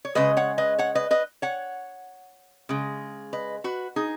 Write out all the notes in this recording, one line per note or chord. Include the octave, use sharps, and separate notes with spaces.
C#5
C#3 G#3 B4 D#5
C#5 F#5
B4 D#5
C#5 F#5
B4 D#5
B4 D#5
C#5 F#5
C#3 G#3
B4 D#5
F#4 B4
D#4 G#4